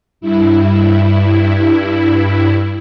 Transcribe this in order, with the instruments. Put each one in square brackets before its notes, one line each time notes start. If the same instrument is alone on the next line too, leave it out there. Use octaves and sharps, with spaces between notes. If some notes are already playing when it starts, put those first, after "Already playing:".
[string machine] G2 E4